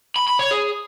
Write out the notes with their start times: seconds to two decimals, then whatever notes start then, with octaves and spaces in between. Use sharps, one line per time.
0.16 B5
0.28 B5
0.39 C#5
0.51 G#4